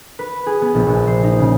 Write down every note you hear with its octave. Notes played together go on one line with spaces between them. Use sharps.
B4
G#4
B3
A#1
A#1
C5
D#4
C#3